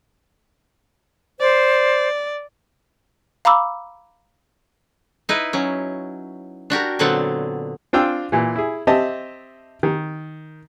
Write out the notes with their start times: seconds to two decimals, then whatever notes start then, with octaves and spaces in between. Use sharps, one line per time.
1.40 C5 D5
3.45 F5 A#5 B5 D6 E6
5.29 D#4 E4 B4
5.53 F#3 C#4
6.70 D4 F#4 G4 A#4
6.99 A#2 D3 F#3 B3 C4 F#5
7.93 C4 D4 F4 G5 E6
8.32 A#2 E3
8.56 E4 G#4
8.87 C4 G4 D#5 E5 A5
9.83 D#3